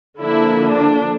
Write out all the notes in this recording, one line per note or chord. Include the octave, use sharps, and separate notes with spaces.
D3 F3 A#3 D4 E4
D4